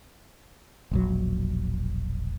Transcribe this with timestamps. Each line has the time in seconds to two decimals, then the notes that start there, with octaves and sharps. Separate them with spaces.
0.91 E1 A#1 F#3